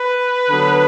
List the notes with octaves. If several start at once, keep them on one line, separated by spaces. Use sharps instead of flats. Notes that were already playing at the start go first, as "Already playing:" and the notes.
Already playing: B4
D3 F#3 B3